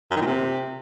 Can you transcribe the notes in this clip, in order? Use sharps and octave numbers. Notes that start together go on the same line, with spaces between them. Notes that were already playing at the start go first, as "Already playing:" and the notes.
F#2
D#3
A#2
C3